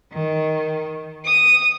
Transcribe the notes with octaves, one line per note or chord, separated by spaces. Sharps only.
D#3
D#6